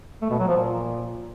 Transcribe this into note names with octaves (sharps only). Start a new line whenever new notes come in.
A3
B2
F#3
F3
A#2